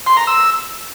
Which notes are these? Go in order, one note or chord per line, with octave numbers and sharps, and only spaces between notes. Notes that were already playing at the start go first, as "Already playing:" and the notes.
C6
A#5
E6